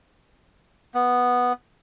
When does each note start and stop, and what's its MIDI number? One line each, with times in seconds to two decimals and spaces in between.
0.94 1.53 59